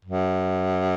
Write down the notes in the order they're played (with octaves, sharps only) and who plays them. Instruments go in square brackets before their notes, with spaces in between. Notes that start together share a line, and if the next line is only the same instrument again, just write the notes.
[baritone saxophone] F#2